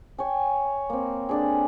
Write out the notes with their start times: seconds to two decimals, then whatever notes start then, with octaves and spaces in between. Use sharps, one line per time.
0.18 C#5 G5 G#5
0.90 A#3 C4
1.29 D3 D4 G#4